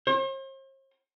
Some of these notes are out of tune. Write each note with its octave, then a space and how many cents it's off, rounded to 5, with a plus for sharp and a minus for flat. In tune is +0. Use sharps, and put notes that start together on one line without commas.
C5 +45